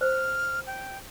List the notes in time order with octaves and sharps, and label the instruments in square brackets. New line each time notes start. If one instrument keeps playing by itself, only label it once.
[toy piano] C5 [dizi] F6
[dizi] G5